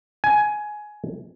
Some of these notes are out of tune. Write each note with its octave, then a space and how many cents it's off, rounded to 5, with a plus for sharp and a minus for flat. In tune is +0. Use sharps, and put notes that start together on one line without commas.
G#5 +15